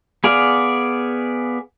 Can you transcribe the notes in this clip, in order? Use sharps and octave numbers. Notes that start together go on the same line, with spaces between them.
B3 G#4 D5 F5